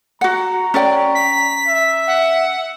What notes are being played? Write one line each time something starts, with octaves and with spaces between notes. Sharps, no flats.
F#4 F#5 A#5
C#4 D5 G5
B6
E5
F#5